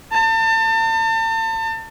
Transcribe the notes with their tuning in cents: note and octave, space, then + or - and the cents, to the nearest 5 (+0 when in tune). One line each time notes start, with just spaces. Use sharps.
A5 +35